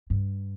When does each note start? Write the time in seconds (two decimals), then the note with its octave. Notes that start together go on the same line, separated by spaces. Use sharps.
0.10 G2